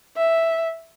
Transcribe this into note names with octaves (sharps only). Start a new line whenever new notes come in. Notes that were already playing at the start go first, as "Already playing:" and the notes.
E5